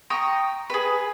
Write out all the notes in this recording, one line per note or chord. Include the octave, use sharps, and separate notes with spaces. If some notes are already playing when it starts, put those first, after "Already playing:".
G5 A#5 C#6 D#6
G#4 B4